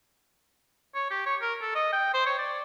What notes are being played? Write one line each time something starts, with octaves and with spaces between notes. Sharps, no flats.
C#5
G4
C#5
A#4
A4
D#5
G5
C5
C#5
D5